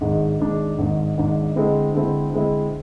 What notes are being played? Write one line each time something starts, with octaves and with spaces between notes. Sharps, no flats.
G#1 G#2 G#3 D4
G#1 G#2 G#3 D4
G#1 G#2 G#3 D4
G#1 G#2 G#3 D4
D3 G#3 C4 E4
D3 G#3 C4 E4
D3 G#3 C4 E4